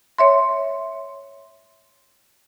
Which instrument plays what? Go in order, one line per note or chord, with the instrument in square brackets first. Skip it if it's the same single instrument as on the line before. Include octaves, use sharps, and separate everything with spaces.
[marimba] C#5 E5 C6